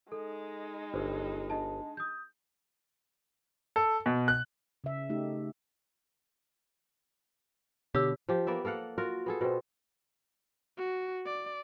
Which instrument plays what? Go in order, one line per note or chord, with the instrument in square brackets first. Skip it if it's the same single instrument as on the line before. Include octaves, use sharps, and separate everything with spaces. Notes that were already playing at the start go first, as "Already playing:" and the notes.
[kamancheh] G#3 D#4 [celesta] A4
[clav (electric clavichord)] G1 [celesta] C5
[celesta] D4 D#5 A5
D#6 G6
[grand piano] A4
B2
F#6
[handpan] C#3 E5
A3 D#4 G4
[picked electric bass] B2 D3 [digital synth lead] G4 [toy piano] C#5 E6
[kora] F3 G4
A#3 B3 D5 E5
A#3 A4 F5 F#5
F4 F#4 A#4
B3 G#4 A4
B2 C4
[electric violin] F#4
D5